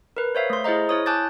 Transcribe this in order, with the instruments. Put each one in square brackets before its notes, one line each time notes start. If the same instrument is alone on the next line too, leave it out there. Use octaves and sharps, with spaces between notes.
[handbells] A#4 B4
C5 C#5 E5 F5
A3 C6
E4 G#4 C5 D#5 A#5
E4 C#5 D#6
G#5 A5 D6 F#6 G6 A6